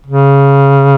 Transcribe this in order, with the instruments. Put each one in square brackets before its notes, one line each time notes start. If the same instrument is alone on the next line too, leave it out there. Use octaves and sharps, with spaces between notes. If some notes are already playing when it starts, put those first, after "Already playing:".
[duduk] C#3